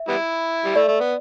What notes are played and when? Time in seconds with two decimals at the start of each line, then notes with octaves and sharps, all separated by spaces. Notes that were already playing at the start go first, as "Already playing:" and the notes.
Already playing: E5
0.08 G3 B3 E4
0.64 G3
0.75 A3 D5
0.88 A3
1.00 B3